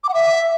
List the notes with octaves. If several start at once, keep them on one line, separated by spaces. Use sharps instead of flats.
D6
F#5
E5